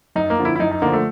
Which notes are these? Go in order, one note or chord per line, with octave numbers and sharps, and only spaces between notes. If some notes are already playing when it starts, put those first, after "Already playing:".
F#2 D#4
A#3
D3 F3
E4
E4
F#2 D#4
D#4
D3 F3 A#3
A3